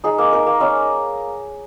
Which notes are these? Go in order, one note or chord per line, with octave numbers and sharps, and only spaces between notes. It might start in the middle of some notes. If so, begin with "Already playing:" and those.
D#4 G#4
A#3
D#4 A#4
A#3
C#4 D#5